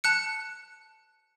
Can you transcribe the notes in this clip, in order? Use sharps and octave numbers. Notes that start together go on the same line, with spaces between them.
A5 F#6 C#7